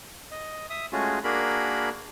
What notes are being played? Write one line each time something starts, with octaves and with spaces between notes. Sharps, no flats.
D#5
E5 D#6
G#3 A3 C#4 F4 F#4 G#4
A#3 D4 F#4 G#4 A#4 B5